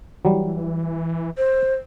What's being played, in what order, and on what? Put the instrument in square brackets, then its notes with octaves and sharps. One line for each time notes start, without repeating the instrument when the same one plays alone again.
[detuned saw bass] E3 [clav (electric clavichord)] F#3 G3
[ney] C5